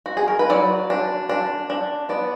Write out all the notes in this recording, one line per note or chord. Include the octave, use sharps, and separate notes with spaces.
F#4
G#4
A#4
B4
F#3 D5
D4
D4
D4
B3 D5